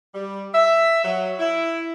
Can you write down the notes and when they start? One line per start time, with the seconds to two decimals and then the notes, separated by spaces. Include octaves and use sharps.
0.15 G3
0.55 E5
1.05 F#3
1.39 E4